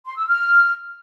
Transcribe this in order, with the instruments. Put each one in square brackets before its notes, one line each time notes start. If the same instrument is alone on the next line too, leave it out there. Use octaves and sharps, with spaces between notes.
[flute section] C6
E6
F6